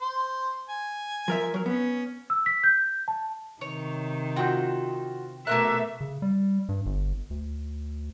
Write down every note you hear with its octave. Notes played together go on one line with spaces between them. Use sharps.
C5
G#5
F3 A#4 E5
F#3 A#4
B3 C#4
E6
B6
G6
A5
C3 D#3 C#5
C4 F4 F#4 G5
B2 A3 A#3 C4 A#4 E5 F#6
C#3
G3
G2
G1
D2